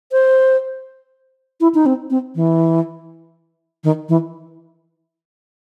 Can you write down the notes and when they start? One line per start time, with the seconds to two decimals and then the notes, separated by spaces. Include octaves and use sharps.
0.12 C5
1.61 E4
1.74 D#4
1.86 C4
2.10 C4
2.35 E3
3.84 D#3
4.09 E3